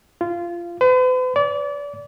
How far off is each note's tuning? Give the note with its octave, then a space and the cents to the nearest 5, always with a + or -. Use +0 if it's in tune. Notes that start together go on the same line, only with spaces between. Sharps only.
F4 -20
B4 +45
D5 -30